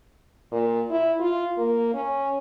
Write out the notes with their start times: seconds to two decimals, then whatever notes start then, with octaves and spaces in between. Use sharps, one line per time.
0.52 A#2
0.90 E4
1.20 F4
1.58 A#3
1.94 C#4